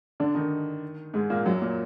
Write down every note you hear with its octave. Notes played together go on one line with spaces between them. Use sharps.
D3 D4
D#3 D#4
G#2 G#3
A#2 A#3
F#2 F#3
A#2